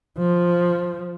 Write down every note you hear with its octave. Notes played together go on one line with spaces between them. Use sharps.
F3